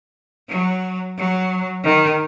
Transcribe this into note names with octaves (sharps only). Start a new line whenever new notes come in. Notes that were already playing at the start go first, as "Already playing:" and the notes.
F#3
F#3
D#3